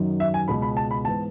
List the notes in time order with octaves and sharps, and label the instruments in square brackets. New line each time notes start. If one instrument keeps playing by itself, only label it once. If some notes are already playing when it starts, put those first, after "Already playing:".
Already playing: [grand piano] F#2 D#3 F#3
E5
G#5
C#2 B2 G#3 B3 B5
B5
A5
B5
G#2 E3 B3 A5